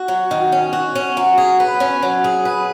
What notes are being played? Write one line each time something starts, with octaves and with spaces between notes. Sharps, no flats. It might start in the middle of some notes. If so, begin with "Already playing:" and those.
Already playing: F#4
F#3
D#3
C#4
F#4
C#4
F#3
G#4
B4
C#4
F#3
G#4
B4